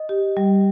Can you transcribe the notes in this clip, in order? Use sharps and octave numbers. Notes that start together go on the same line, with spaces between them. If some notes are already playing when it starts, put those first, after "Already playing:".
Already playing: D#5
G4
G3